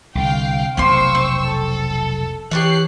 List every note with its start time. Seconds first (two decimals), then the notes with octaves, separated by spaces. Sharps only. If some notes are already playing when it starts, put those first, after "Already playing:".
0.15 C2 D3 F5 G5
0.77 F1 B1 A#3 C4 C5 C6 C#6 E6
1.15 C4
1.46 A4
2.51 E3 G4 A4 C#5 F#6 C7